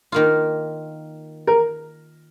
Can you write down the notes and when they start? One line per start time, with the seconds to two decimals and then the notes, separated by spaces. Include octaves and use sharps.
0.12 D#3 A#3 F4
1.47 A#4